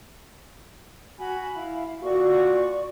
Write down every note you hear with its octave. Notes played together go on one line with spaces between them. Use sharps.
F#4 G#5 B5
E4 F5
A#2 F#4 D5 C#6